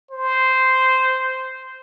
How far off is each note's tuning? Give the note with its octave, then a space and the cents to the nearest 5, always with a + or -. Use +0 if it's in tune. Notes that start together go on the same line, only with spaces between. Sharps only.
C5 -10